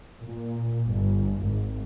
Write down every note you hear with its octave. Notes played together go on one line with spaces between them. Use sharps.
A#2
G1
G#1